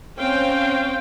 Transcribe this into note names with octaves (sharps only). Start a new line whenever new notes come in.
C4 C#4 C5 F5 G5